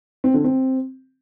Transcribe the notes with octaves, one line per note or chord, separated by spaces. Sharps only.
C4
D3
C4